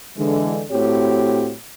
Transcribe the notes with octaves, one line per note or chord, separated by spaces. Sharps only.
D3 E3 G#3
A2 C4 F#4 G4 C#5